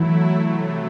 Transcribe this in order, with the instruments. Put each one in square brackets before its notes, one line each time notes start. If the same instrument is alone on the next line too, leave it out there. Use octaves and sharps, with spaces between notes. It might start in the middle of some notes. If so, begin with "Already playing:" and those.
Already playing: [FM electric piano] E3 [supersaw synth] F#3 A3 E4
[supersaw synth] C3 F#3 A3